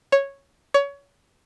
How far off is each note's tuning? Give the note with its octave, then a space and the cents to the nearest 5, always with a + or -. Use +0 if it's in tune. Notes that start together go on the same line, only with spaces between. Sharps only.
C#5 -5
C#5 +25